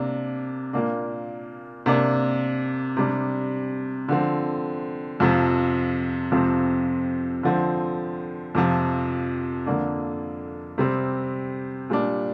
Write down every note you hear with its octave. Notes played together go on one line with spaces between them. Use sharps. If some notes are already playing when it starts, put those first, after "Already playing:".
Already playing: C3 A#3 D4
A#2 A#3 D4
C3 A#3 D4
C3 G3 D4
D3 F3 C4
F2 C3 F3
F2 C3 F3 C4
D3 F3 C4
F2 C3 F3
F2 D3 A#3 D4
C3 G3 C4
A#2 G3 D4